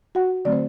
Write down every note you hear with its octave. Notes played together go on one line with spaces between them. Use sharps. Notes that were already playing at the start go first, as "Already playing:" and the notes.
F#4 F#5
D3 F#3 A3 C4 D5
C5